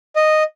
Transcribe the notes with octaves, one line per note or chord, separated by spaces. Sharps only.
D#5